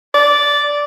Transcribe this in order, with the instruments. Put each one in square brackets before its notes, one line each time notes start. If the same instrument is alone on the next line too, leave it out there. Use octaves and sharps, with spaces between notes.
[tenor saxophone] D5